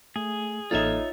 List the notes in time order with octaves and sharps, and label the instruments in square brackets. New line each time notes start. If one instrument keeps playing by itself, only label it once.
[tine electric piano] A3 [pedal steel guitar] G#4
[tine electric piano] A1 A#3 A4 [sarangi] D#4 [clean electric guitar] F4 C#5 E5